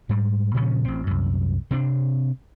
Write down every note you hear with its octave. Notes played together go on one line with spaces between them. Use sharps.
G#2 G3
A#2 C#3 F3 C#4
A1 C4
C2 F#2
C3 C4 D4